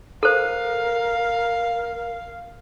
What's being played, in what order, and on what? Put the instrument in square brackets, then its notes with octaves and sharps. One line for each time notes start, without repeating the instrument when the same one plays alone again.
[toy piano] A4 C5 [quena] A#4 [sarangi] F5